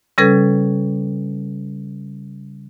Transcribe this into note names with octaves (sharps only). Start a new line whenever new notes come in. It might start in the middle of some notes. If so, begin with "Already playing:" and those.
C#3 G3 C#4 A4 B4 G#6